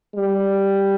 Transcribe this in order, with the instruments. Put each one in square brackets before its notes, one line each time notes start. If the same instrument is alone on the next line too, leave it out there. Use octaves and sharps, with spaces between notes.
[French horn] G3